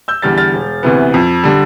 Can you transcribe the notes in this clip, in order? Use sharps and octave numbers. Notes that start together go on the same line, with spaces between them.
E6 G6
E2 D3 G3 F6 A6
F6 A6
E1
D2 C3 E3 B3
F2
D3 G3